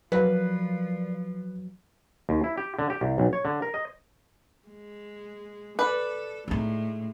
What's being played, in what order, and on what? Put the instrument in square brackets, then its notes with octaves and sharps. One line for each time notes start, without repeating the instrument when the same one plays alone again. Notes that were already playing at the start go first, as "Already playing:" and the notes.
[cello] F3 [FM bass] F#3 [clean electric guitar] A#4 D5 F5 [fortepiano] B4
[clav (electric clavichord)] D#2
E4
G4
D3
G4
C2
B1
C#5
D3
A#4
D#5
[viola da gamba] G#3
[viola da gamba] A4 [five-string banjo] B4 [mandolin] D5
[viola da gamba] A2 G#3 [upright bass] D4 D#4